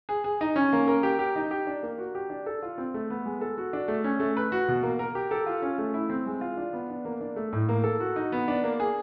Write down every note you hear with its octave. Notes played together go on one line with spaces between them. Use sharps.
G#4
G#4
D#4
C#4
A#3
A#4
G4
G4
D#4
G4
D4
A#3
F#4
G4
D4
A4
F4
C4
A3
B3
G#3
A4
F#4
D4
A3
C#4
A3
B4
F#4
B2
A#3
A#4
G4
A4
F4
C#4
A3
E4
C4
G#3
F4
D4
B3
D4
A#3
D4
A3
A2
A#3
A4
F#4
D#4
B3
D4
A#3
G#4